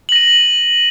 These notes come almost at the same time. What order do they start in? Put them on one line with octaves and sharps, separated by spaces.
F#7 A#6 D#7